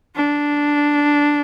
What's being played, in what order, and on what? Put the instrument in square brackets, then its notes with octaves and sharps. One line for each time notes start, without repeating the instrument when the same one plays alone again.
[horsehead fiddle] D4